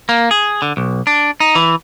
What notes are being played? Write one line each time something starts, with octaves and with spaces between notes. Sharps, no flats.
A#3
G#4
D3
B1
D4
D#4
E3